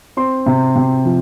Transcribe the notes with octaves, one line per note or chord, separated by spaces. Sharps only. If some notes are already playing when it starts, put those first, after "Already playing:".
C4 C6
C3
C3
F3